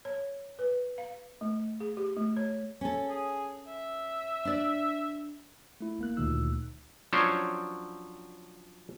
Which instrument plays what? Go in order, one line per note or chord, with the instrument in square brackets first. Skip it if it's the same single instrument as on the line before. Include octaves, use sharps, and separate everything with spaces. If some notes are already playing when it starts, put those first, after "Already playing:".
[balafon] C#5
B4
F5
A3
G#4
G4
A3
C#5
[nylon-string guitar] C#4 A4
[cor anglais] G#4
E5
[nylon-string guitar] D4 D5
[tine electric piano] A3 E4
G1 A#3 F#6
D2 A#2 D#3 D#4 E6 F#6
[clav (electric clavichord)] F3 F#3 C#4 D4 C5 C#5